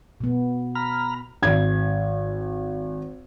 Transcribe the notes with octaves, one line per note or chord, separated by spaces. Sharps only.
B2 B3
A#5 B5 F6
G#1 G#6